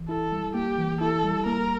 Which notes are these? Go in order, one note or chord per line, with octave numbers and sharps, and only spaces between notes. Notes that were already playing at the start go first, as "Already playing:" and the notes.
Already playing: E3
E4 A4
G3
A#3 G4
E3
E4 A4
G3
A#3 A#4